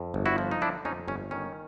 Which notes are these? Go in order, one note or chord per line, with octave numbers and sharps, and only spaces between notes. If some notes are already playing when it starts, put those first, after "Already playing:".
Already playing: F2
G1
E4 F#4
F3
D#4
D3 D4 E4
F2 C#4 D#4
G1 C#4
D#3 C#4